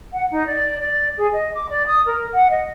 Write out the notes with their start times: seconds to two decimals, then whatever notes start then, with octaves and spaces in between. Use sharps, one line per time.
0.13 F#5
0.30 D#4
0.46 D5
0.79 D5
1.17 G#4
1.32 D#5
1.53 D6
1.70 D5
1.87 D#6
2.05 A#4
2.32 F#5
2.50 D#5